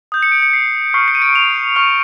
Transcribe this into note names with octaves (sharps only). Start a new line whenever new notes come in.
D#6 G6
C#7
D7
C#7
C7
C#6 F6 C7
C#7
D#7
D7
F7
C#6 F6